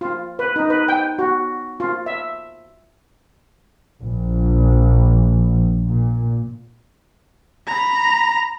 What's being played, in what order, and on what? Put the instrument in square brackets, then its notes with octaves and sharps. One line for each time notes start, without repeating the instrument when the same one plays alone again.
[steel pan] F4
B4
D#4
B4
G5
F#4
F4
E5
[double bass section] A#1
A#2
[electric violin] A#5 B5